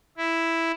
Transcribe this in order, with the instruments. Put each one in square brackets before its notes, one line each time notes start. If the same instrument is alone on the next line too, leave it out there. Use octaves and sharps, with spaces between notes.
[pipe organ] E4